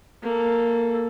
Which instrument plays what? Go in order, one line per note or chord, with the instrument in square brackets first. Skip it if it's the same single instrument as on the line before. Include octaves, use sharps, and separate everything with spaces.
[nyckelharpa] A#3 A4